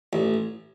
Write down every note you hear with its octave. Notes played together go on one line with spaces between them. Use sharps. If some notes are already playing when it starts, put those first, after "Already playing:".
A1